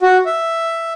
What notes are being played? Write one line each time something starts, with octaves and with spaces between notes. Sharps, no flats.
F#4
E5